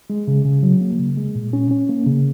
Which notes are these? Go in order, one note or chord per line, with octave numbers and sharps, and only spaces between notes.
G#3
C#3
C#3
F#3
A#3
C#3
G#3
A#2
C#4
C#4
A#3
C#3